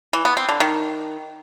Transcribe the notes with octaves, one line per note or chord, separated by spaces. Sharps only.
E3
B3
C4
D3
D#3